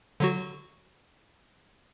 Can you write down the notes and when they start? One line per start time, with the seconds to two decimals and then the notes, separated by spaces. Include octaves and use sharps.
0.20 D3 F#3 F#4